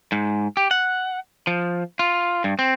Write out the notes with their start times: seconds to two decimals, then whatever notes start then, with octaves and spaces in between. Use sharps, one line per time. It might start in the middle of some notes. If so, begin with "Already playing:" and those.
0.12 G#2
0.57 G4
0.71 F#5
1.47 F3
1.99 F4
2.44 G2
2.59 C4